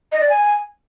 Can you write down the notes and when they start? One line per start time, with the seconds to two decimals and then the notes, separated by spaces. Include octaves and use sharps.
0.12 D#5
0.21 D5
0.29 G#5